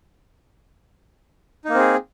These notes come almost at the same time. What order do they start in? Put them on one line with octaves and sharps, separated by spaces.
D#4 A#3 C4 G#4